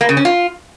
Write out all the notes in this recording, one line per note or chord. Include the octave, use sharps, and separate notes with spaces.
A#3
C#3
C#4
F4